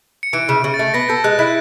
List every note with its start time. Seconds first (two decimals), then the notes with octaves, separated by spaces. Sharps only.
0.23 C#7
0.33 E3 D7
0.49 C#3
0.64 C#3
0.74 A6
0.79 A3
0.94 B3 A#6
1.09 A4 G6
1.24 G#3 F#6
1.39 E4 F#6